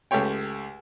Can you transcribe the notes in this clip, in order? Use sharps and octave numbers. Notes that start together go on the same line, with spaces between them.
C#2 A3 G4 C#5 G5